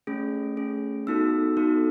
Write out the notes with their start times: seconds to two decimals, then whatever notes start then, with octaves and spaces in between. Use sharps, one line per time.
0.07 A3 C#4 G#4
0.57 A3 C#4 G#4
1.07 B3 D#4 F#4 A4 E6
1.57 B3 D#4 F#4 A4